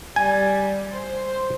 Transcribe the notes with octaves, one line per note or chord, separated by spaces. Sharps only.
G3 G#5
C5